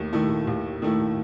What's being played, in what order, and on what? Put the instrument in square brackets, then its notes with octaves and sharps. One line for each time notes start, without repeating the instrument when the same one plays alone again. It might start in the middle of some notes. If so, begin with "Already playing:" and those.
Already playing: [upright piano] D#2 D#3 A3
D#3 A3 E4
D#2
D#3 A3 E4